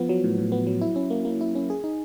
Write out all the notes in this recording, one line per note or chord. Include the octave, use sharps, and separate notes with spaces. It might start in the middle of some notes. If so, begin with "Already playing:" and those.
Already playing: F3 B3
F#3
A2
A2
B3
F#3
E4
C#4
A#3
A#3
E4
C#4
G#4
D#4